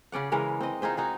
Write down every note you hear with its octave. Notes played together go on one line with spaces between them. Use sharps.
C#3 C#4 D5 F#5
C#3 E3 G#3 A#4
C4 D#5
D#4 F4 G#4 C5
D#4 F#4 G#4